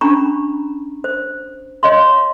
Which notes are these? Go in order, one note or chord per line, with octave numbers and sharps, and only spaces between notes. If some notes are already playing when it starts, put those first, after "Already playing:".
C#4 D4 A#5 B5 C#6
C5
C#5 D#5 F5 C6